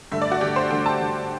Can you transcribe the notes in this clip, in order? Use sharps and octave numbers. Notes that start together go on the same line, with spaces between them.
G2 D3 A3 E5
D5
F#4
G2 D3 A3 G4
C5
G2 D3 A3 G5
A5
G2 D3 A3